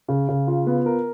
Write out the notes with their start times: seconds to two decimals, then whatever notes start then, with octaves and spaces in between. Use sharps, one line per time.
0.08 C#3
0.28 C#3
0.47 F4
0.67 B3
0.86 A#4